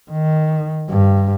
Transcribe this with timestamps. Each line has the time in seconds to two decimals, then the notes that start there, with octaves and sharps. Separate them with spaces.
0.11 D#3
0.90 G2